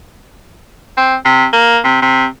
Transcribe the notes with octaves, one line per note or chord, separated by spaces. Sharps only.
C4
C3
A#3
C3
C3